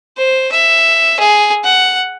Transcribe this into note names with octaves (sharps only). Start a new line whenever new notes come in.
C5
E5
G#4
F#5